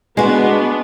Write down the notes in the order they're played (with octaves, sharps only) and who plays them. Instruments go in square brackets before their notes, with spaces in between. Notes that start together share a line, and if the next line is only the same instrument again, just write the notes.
[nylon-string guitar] G#3 F#4 [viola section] B3 D4